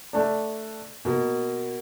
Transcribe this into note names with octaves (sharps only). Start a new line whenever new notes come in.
A3 D4
B2 A#3